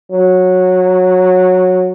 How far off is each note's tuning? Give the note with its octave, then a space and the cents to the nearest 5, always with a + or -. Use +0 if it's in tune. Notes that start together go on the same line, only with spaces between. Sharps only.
F#3 -10